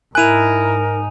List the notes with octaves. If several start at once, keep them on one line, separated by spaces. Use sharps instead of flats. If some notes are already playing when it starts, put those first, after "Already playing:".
G#2 D#4 E4 A#4 G#5 F#6 D#7 F7